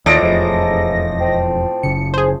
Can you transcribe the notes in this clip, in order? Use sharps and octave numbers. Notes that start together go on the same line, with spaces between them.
D#2 A2 F3 D4 D#5 D6 A#6
E1 F2 G#2
C4
F#1 C#3 C#7
G#4 C5